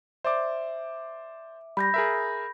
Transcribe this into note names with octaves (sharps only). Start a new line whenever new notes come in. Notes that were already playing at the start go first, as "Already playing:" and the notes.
C5 D5 E5 D6
G3 B5 G6 A#6
G#4 A#4 E5